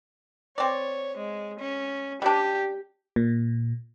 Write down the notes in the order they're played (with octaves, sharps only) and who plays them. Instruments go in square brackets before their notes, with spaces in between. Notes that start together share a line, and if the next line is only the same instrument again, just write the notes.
[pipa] C4 D5 [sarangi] C#5
[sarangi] G#3
C#4
[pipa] G3 D4 [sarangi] G4
[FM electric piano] A#2